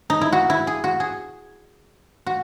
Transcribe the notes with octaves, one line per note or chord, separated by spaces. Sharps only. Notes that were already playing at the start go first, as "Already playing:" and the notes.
D#4
E4
F#4
E4
G#4
F#4
G#4
F#4